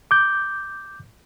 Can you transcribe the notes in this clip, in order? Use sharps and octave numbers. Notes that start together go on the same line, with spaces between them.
D6 G6